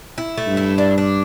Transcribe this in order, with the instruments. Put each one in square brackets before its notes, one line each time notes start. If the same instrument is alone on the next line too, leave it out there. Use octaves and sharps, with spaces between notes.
[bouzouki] E4
A3
[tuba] G2
[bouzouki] E4
D4
D4